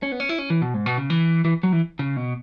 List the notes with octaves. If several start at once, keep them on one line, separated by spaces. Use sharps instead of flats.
C#4
B3
C#4
E4
C#4
E3
B2
G#2
B2
C#3
E3
E3
F#3
E3
C#3
B2